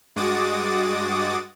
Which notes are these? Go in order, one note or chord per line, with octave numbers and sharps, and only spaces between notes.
G2 G#3 F#4 D6 D#6 A6